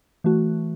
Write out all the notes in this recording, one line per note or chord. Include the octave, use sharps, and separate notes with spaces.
E3 A3 F#4